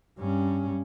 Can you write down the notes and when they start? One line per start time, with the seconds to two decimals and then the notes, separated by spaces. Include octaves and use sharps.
0.19 G2 C#4